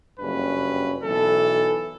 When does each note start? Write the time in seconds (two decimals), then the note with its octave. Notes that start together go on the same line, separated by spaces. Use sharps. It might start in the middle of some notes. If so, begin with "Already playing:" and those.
0.20 F#1 G2 C#4 B4
1.04 B1 E3 A4